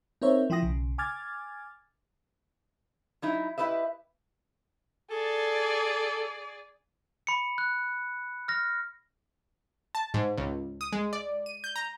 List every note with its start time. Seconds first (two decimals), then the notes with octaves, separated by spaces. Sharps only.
0.22 C4 D#4 A#4 C5 C#5 E5
0.50 F3 E4 F4 G5 D#6 A#6
0.62 B1 C#3
0.98 G#5 D6 F6 G#6 A6
3.22 F#3 D#4 E4
3.58 E4 G4 B4 D#5 E5
5.10 G#4 A4 D5
7.27 B5 C#7
7.58 F#6
8.48 F6 A#6
9.95 A5
10.14 G#2
10.38 C#2
10.81 D#6
10.93 G#3
11.13 D5
11.46 D#7
11.64 G6
11.76 A#5